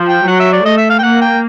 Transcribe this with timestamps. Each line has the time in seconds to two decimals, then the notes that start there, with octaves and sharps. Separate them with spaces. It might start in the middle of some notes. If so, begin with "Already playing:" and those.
Already playing: F3
0.09 G5
0.28 F#3 F#5
0.40 E5
0.53 D5
0.65 A3 D#5
0.78 E5
0.90 F5
0.99 G5
1.03 A#3 F#5
1.21 G5